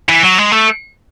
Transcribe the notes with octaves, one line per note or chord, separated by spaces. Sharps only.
E3
F#3
G#3
A3